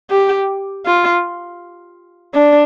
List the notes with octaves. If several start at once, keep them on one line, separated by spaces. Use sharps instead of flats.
G4
F4
D4